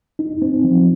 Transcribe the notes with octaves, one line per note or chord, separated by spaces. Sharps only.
D#4
C4
F3